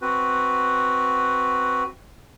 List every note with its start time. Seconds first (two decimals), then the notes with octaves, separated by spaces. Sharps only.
0.02 C4 F#4 B4